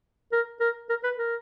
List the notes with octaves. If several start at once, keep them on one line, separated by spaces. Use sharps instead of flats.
A#4
A#4
A#4
B4
A#4